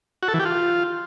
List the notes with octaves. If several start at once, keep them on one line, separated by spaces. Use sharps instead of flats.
F#4
A4
E3
G4
F4